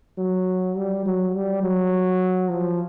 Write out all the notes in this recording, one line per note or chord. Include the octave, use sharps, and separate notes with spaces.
F#3
G3
F#3
G3
F#3
F3